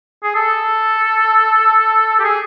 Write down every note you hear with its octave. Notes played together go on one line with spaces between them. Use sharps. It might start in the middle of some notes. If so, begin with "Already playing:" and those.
G#4
A4
G4
G#4